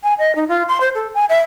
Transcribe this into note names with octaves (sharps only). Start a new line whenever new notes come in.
G#5
D#5
D#4
F4
C6
C5
A4
G#5
E5